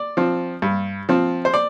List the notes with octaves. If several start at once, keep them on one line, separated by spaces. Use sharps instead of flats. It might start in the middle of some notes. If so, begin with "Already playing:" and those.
Already playing: D5
F3 C4
G2
F3 C4
C5
D5